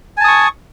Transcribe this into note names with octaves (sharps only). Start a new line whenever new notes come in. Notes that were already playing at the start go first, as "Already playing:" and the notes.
G#5 A5 C#6 D#6